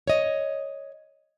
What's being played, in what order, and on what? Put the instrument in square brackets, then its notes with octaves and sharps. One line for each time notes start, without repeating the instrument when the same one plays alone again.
[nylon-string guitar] C#5 D#5